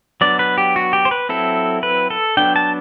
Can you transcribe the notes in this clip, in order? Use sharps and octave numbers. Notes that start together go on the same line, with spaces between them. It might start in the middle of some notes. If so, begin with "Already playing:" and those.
F#3 B3 D4 D5
B4
G4
F#4
G4
C5
B4
F#3 C4 E4 A4
B4
A4
F#3 B3 D4 G5
A5